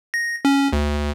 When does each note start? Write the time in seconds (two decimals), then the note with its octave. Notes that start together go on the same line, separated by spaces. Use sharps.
0.14 A#6
0.45 C#4
0.73 D2